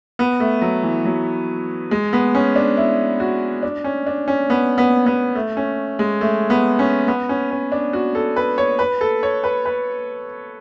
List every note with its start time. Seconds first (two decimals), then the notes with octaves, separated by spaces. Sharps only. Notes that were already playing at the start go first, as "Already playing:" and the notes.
0.19 B3
0.40 A3
0.62 F#3
0.83 E3
1.05 F#3
1.91 G#3
2.13 B3
2.35 C#4
2.56 D4
2.77 E4
3.20 F#4
3.63 D4
3.84 C#4
4.07 D4
4.28 C#4
4.50 B3
4.78 B3
5.06 B3
5.35 A3
5.57 C#4
5.99 G#3
6.21 A3
6.50 B3
6.79 C#4
7.08 B3
7.29 C#4
7.51 C#4
7.72 D4
7.93 F#4
8.15 A4
8.36 B4
8.58 C#5
8.79 B4
9.01 A4
9.23 C#5
9.44 B4
9.65 B4